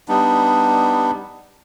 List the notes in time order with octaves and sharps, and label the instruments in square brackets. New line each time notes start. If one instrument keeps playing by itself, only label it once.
[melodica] G3 B3 D4 D#4